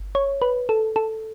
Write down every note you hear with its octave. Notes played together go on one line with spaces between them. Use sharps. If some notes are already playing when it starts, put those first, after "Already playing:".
Already playing: G1
C#5
B4
A4
A4